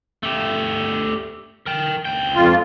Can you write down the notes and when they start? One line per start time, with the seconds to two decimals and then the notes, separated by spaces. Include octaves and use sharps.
0.23 A3 G4
1.66 A#4 G5
2.05 C#2 G5
2.35 F2 F4